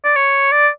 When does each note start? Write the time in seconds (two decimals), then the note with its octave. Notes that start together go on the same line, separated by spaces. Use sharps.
0.04 D5
0.16 C#5
0.52 D5